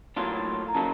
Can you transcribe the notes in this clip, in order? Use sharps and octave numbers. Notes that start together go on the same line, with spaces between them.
A2 F#3 A#3 D4 F4
A#5
C#3 F#3 A#3 D#4 A5